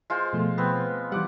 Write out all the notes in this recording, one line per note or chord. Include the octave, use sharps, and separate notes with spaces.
G#3 F4 C5
B2 F3 A3
B3 C4
E3 G3 F#5 D6